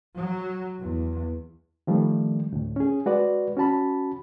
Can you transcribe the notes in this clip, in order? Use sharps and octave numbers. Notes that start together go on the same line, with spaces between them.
F#3
E2
D#3 F3 G3 A3
D2 A2
C#4 G#4
G#3 F#4 B4 D5
C#4 F#4 A5 B5